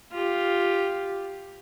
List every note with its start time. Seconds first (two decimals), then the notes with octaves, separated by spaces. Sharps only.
0.12 F4 G4